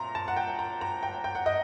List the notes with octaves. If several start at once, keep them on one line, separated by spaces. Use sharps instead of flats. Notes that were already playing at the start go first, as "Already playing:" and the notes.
Already playing: A#2 A3 C4 A#5 C6
A5
F#5
G5
A#5
A#5
G5
G5
F#5
D#5